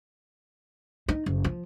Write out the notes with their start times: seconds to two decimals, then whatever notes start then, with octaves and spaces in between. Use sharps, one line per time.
1.08 D#4
1.26 F#1
1.44 F3